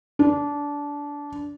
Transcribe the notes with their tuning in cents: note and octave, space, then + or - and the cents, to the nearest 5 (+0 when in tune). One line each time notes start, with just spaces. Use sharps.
D4 -20